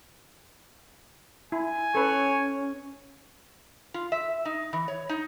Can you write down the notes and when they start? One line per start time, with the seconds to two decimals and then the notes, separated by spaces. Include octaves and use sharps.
1.52 E4 G#5
1.95 C#4 A4 B4 C#5
3.94 F4
4.12 E5
4.45 D#4
4.73 E3
4.88 C#5
5.09 D#4